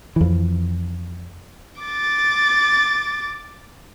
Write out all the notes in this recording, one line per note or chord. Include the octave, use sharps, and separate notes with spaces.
F2 E3
D6 A6